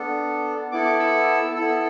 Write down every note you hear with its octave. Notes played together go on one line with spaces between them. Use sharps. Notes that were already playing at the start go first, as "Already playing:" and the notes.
Already playing: B3 D4 A4
B3 E4 A4 D6
D6
E6
B3 E4 A4 E6